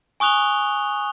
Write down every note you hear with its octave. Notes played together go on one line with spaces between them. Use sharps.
G#5 C#6 D#6 F#6 F7 G7